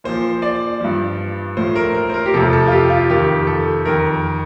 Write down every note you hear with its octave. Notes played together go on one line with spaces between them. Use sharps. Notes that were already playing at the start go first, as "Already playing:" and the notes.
A#2 F3 C5
D5
G2 F3
A2 F3 C5
A#4
A#4
C5
A#4
G4
F2 C3 F3 A4
A4
F4
G4
F4
F2 D#3 G4
A4
F2 D#3 A#4